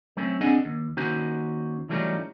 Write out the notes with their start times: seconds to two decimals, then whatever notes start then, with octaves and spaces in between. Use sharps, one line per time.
0.17 F#3 A3 C4 C#4
0.41 C4 D4 G#4 D#5 F#5 G#5
0.65 D#2
0.97 D#2 C#4 D#4 F#4 C5
1.89 E3 F#3 G3 A3 C#4 D#4